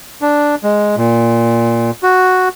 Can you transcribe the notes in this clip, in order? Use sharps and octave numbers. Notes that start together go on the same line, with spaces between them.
D4
G#3
A#2
F#4